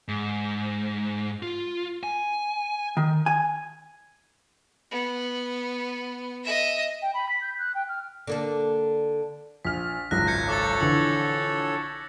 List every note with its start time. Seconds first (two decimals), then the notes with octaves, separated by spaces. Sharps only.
0.08 G#2
1.43 F4
2.03 G#5
2.97 D#3
3.26 G#5
4.91 B3
6.44 D#5 E5
7.02 G5
7.14 B5
7.29 B6
7.42 G6
7.59 F#6
7.75 G5
7.88 F6
8.27 D3 A#3 D4
9.65 A#1 F6 B6
10.11 G#1 C#2 F#2 F#6 A#6
10.27 G6 G#6 C#7
10.48 A4 C#5 D6 A6
10.80 A#1 D3 E3 E6